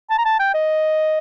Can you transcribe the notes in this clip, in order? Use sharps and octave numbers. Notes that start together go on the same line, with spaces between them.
A5
A#5
A5
G5
D#5